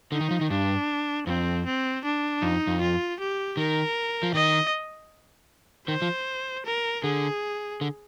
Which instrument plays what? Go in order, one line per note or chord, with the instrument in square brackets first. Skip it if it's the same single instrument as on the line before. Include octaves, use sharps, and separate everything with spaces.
[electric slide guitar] D3 [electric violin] D#4
[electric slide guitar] D#3
F3
D#3
[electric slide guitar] G2 [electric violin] D4
[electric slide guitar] F2 [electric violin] C4
[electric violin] C4
D4
[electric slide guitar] F2 [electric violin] D#4
[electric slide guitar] F2
[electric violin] F4
G4
[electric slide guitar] D#3 [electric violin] A#4
[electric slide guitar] F3
[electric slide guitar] D#3 [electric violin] D#5
[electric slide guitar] D#3 [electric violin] C5
[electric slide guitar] F3
[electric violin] A#4
[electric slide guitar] D3 [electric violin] G#4
[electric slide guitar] D3